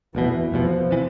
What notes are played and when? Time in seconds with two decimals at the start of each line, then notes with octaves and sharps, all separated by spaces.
0.15 F1 E2 B2 E3
0.52 F1 E2 B2 F3
0.91 C3 E3